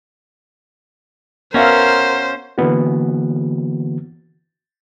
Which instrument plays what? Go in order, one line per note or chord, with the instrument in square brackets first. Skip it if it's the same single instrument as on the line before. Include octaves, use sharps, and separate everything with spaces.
[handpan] B3 E5 F5 [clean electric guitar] C#4 F#4 [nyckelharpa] A#4 [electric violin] C5
[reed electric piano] D3 E3 A#3 B3 F#4